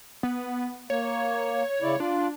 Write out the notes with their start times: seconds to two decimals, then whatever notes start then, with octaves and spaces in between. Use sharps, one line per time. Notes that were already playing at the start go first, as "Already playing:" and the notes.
0.23 B3
0.90 A#3 C#5
1.82 C#3 E4 D5
2.00 D4 F4